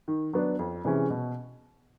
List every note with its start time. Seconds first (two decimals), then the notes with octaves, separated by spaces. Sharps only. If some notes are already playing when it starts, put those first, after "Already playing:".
0.08 D#3
0.33 F#3 B3 D4
0.59 F2
0.85 C3 E3 G#3 C#4
1.10 B2